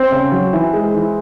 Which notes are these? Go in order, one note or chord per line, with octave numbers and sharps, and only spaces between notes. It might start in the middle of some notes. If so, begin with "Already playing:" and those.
Already playing: C4
C#3
F#3
E3
G#3
E3